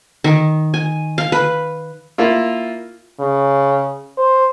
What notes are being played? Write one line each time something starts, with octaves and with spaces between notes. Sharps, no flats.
D#3
G#5
F5
B4
A#3 E4 F4
C#3
C5